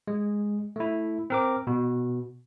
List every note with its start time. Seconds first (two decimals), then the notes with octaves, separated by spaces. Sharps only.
0.08 G#3
0.76 A3 E4
1.30 C4 A#4 D6
1.67 B2